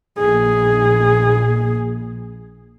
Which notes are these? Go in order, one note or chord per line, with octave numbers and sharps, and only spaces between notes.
A#1 G#4